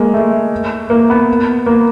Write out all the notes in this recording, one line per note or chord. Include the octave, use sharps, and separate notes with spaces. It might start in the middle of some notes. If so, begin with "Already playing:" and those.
Already playing: G#3 A#3
A3
A#3
B3
A#3